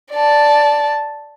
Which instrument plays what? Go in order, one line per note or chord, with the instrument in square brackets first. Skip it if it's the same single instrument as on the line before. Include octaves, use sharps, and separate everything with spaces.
[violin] D5 A5